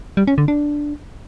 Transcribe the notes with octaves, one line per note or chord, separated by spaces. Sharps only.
G3
C#4
D3
D4